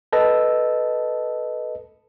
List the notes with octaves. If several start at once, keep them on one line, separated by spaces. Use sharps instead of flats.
A4 B4 D#5 A5 E6